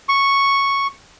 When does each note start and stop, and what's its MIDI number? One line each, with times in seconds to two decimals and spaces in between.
0.09 0.87 85